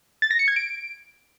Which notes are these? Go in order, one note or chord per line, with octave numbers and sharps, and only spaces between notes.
A6
A#6
C#7
G#6
D7